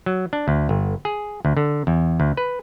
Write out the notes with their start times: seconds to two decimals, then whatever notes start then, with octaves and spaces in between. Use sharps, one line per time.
0.06 F#3
0.33 D4
0.48 D2
0.69 G1
1.05 G#4
1.45 D2
1.57 D3
1.87 E2
2.20 D2
2.37 B4